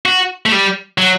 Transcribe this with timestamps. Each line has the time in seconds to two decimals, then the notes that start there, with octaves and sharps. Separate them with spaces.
0.06 F#4
0.46 A3
0.52 G3
0.98 F#3